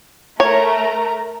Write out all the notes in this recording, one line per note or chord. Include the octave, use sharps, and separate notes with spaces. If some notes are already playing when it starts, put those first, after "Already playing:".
A3 A#4 C#5 A#5